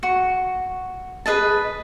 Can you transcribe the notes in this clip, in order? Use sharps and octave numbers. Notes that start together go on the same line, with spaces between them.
F#4 C#6
G#4 B4 D#5 A5